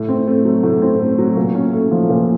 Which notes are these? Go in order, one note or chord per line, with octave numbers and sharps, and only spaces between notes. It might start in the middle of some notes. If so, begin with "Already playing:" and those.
Already playing: A2
C4
A3
F#3
A2
C4
A3
F#3
A#2
C#4
A3
F3
A#2